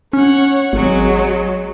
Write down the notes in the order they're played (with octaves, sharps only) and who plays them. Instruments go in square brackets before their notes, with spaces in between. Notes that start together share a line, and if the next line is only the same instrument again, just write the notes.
[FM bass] C#4 [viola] C#5 F#5
[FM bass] G#1 [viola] F#3 G#3